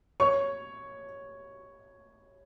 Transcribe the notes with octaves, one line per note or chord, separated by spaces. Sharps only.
C#5 C#6